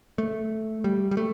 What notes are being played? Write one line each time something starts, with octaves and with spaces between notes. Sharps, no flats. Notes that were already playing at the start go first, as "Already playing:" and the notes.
A3
G3
G3
A3